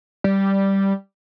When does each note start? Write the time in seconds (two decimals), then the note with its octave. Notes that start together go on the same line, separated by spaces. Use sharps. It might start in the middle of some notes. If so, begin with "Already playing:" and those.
0.24 G3